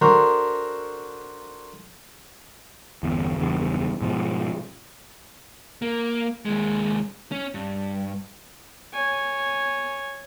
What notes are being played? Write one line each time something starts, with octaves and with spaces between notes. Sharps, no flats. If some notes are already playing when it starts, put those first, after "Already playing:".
D4 F#4 A4 A#4 C5 A#5
G1 E2
F#1 E2 G2
G#2 B2 F3
A#3
D#2 G#3
C#4
G2
C#5 G#5